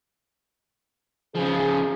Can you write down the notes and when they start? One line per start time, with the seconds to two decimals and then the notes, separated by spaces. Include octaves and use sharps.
1.35 C#3 F3 G#4